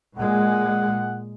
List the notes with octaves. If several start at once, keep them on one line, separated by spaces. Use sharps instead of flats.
A#2 G#3 F#5